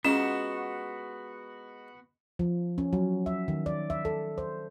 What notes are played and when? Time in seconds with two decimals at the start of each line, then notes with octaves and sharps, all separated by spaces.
0.05 G#3 B3 C#4 D#4 F4 F#4 E7
2.39 F3
2.78 C#4
2.93 F#3
3.26 E5
3.48 D#3
3.66 D5
3.90 E5
4.05 A4
4.38 C5